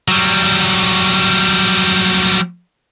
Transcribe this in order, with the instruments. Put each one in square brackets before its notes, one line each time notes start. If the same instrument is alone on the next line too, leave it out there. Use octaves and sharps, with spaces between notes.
[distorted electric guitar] F#3 G3